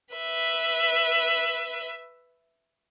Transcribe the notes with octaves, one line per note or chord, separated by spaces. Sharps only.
B4 E5